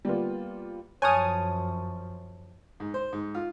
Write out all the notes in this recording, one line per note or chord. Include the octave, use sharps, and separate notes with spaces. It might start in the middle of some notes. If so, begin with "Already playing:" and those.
G3 A#3 B3 F4
F#2 F3 C#5 G#5 A5 C#6 D#6 F6
G#2
C5
G#2
F4